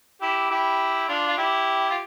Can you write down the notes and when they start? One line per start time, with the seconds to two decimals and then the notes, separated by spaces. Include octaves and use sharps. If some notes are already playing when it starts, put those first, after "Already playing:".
0.22 E4 G4
0.50 E4 G4
1.08 D4 F4
1.27 F4
1.38 E4 G4
1.90 F4